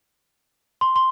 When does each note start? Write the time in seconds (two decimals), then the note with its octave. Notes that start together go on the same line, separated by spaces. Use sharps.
0.81 C6
0.96 C6